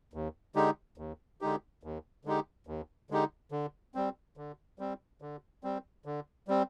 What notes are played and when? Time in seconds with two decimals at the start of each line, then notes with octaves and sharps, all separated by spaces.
0.14 D#2
0.56 D3 G#3 D#4 G4
0.98 D#2
1.41 D3 G#3 D#4 G4
1.83 D#2
2.25 D3 G#3 D#4 G4
2.67 D#2
3.10 D3 G#3 D#4 G4
3.52 D3
3.95 G3 C4
4.37 D3
4.79 G3 C4
5.22 D3
5.63 G3 C4
6.05 D3
6.48 G3 C4